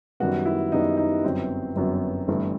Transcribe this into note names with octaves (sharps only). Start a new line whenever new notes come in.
F#2 D#3 G3 B3 F#4
E4
F#2 D#3 G3 B3 D#4
D#4
G1 F#2 F#3 B3 C4
G1 F#2 F#3 B3
G1 G2 E3 A3